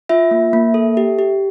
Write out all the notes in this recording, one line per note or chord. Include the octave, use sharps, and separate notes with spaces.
F4 E5
A#3
A#3
A4
G4
G4